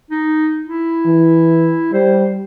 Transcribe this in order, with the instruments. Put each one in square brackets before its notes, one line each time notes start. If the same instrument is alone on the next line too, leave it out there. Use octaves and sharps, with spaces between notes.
[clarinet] D#4
E4
[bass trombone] E3
[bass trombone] G3 [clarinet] C5